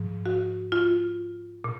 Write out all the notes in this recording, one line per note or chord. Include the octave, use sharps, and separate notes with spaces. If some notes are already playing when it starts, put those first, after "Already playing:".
Already playing: G#2 F3
F#4
F4
A#2